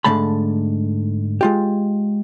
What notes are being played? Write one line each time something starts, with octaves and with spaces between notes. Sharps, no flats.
G#2 D3 A3 A5 B5
G#3 F4 G4